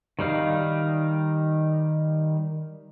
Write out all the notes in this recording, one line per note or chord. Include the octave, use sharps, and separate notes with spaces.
D#3 G3 D#4 F5